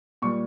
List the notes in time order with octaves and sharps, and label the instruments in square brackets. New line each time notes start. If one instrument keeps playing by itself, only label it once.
[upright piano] A#2 G3 C#6